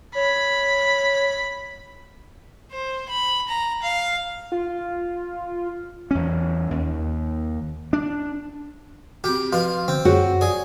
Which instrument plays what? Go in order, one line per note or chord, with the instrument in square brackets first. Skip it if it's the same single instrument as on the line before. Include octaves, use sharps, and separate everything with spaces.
[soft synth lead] C#5 [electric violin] B5
[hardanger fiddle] C5
B5
A#5
F5
[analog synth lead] F4
[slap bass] E2 C#4
D#2
D4
[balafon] C4 F#4 [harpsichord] G4
[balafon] F3 F#4 B4 [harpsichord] F4
[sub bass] D3 [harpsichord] C4
[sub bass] F#2 [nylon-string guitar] F#4 [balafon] G#4 C#5
[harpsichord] G#4 [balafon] D5